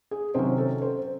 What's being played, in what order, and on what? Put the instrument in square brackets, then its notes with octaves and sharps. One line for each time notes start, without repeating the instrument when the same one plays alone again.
[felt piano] G#4
C3 D#3 F#3 C#4 C5
A4
C5